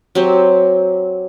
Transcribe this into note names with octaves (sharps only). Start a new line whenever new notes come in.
F#3 C4 G4